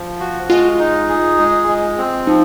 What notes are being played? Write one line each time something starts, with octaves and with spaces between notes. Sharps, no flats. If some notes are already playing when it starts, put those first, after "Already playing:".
Already playing: F3
F#4
G#3 F4
D#4
G#4
G#3
G#3
C4
F3 D#4